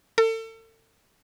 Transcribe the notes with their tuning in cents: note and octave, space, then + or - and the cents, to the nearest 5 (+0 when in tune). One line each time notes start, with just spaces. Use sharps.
A4 +35